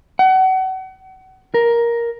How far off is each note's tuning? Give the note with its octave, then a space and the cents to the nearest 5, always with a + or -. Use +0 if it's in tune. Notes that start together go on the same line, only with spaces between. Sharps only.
F#5 +35
A#4 +10